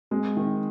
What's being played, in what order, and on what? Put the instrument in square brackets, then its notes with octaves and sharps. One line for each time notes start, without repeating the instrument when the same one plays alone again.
[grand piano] G#3 [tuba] C4
[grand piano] D#3